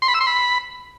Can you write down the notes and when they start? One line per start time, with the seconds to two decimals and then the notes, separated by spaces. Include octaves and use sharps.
0.02 C6
0.08 B5
0.14 E6
0.21 C6
0.27 B5